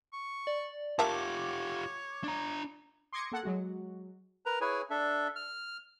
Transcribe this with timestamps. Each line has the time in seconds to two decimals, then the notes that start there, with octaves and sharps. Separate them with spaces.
0.13 C#6
0.47 D5
0.99 A#3 F4 G4 C#5 E5 A5 D6
2.24 D4 A#5
3.13 C6 D6 D#6 G#6 A#6 C#7
3.32 A#3 A4 F#5
3.43 F#3 G#3 F#4
4.46 A#4 B4 A#5
4.61 E4 G#4 B4 C#5 G#5
4.90 D4 A4 E5
5.35 F6